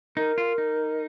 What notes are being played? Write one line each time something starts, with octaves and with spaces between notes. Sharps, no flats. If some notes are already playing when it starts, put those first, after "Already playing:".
D#4 A#4
F4
D#4